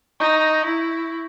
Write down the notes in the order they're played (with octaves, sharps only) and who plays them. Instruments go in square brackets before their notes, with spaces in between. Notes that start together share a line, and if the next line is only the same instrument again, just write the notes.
[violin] D#4 [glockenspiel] C#6 G6 A#6
[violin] E4